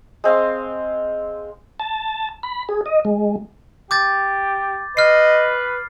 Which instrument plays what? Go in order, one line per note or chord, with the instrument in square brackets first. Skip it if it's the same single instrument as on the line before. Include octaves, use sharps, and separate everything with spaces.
[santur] G#3 C4 F5 C6
[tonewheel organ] A5
B5
G#4
D#5
G#3
[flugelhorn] G4 [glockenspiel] D6 G6 A6
[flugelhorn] B4 [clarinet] D#5 [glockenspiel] F6 C7